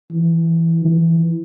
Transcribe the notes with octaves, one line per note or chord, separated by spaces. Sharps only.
E3
E3